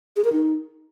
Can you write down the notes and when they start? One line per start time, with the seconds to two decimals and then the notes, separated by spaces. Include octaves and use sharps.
0.16 G#4
0.24 A#4
0.32 D#4